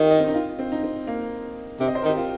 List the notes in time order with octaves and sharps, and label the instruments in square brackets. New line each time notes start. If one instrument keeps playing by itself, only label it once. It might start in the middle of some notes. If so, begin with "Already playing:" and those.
Already playing: [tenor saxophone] D#3 [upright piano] C4 F4 G4
[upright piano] D#5
C4
D#4
F4
C4
D#4
C4
A#3
[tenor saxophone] C3 [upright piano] C4
[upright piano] D#5
C5
A#4
[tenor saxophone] D#3
[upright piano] G4
F4